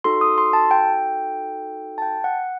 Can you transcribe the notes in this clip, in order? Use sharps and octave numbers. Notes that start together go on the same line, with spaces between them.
D#4 F#4 A4 C6
D#6
C6
A5
G5
A5
G5
F#5